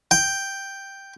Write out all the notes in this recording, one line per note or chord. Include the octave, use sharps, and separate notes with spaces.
G5